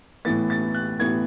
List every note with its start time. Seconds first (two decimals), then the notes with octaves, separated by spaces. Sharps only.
0.25 A2 E3 B3 A6
0.50 A6
0.74 F#6
1.00 A2 E3 B3 G#6